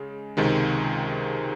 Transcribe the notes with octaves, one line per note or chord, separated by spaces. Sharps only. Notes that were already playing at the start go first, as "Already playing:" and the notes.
Already playing: C#3 G#3
C#2 C3 D#3 G#3